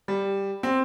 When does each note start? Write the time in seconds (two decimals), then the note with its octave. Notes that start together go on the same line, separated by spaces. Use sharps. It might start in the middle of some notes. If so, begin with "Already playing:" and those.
0.08 G3
0.63 C4